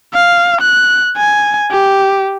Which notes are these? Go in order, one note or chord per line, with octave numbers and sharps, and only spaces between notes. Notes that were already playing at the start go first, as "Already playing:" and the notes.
F5
F#6
G#5
G4